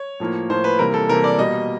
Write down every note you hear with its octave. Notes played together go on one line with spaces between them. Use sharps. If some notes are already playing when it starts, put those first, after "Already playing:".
Already playing: C#5
A2 F3 A#3
A2 F3 A#3 C5
B4
C3 E3 G3 A#3 A#4
A4
C3 E3 G3 A#3 A#4
D5
B2 G3 A#3 D#5